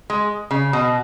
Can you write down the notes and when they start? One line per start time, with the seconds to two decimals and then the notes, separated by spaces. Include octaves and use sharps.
0.10 G#3
0.51 C#3
0.73 B2